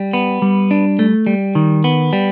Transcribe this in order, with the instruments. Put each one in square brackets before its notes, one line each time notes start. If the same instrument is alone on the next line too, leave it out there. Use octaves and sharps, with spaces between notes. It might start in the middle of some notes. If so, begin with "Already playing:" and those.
Already playing: [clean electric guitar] G3
B3
G3
D4
A3
G3
D#3
B3
G3